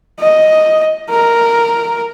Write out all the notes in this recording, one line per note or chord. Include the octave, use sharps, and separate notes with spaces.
D#5
A#4